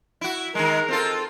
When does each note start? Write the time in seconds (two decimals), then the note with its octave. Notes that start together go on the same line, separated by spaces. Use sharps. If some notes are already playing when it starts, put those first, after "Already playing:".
0.21 E4 F#4
0.55 D#3 G#3 A#4
0.89 C4 F4 A4